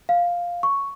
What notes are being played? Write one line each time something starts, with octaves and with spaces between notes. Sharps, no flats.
F5
C#6